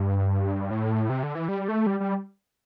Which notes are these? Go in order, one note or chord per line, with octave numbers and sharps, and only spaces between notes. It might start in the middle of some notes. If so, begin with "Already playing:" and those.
Already playing: G2
A2
C3
D3
E3
G3
A3
G3
G3